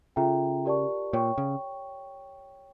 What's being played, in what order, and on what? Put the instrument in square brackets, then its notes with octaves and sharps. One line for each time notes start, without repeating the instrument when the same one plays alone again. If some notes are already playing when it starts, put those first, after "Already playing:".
[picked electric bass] C#3 [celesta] F4 A4 E5 G5 A#5
[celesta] G4 A#4 D5 A5 C#6
[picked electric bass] A#2 [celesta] C#5 G5 C#6
[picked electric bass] C#3